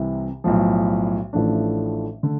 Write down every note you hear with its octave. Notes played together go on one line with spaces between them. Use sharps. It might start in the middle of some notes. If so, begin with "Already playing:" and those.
Already playing: C2 C3 E3
B1 A2 F3
A1 A2 F3 A3 D4
D3 A3